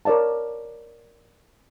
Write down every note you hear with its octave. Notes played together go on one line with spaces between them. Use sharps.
A#4 C#5 D5 F5 A5